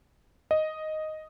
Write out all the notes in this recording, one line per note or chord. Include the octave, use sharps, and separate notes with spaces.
D#5